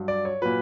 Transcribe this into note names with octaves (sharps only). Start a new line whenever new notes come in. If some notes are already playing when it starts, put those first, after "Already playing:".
Already playing: G2 F#3
D5
C#5
A#2 F#3 B4